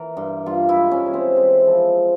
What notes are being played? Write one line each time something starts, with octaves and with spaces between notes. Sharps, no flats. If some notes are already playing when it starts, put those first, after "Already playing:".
Already playing: E3 A#4
G2
G2 F4
E4
G#3
C#4
E3
C4
G#3
F3